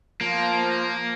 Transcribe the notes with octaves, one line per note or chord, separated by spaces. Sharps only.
F3 A#3